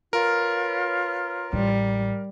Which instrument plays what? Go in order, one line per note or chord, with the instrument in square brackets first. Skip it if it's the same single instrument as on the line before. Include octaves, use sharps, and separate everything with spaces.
[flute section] F4 B4 C#5 [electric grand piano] A#4
[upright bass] A1 [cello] G3